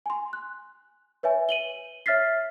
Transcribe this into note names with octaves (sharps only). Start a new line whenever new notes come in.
G#5 C6
F#6
B4 C#5 E5 G#5
D#7 F#7 G7
C#5 E5 F6 A6 B6 C7